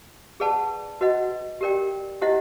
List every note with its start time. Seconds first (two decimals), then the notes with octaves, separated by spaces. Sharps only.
0.40 G#4 B4 D5 F#5 A5
1.01 F#4 B4 D#5 F#5
1.61 G4 A#4 D5 G5
2.22 E4 G4 C5 D#5 F#5